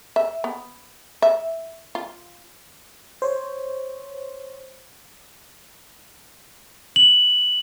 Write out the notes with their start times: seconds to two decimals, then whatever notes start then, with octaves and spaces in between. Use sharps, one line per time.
0.16 E5
0.44 B3
1.22 E5
1.95 F4
3.22 C5 C#5
6.96 F#7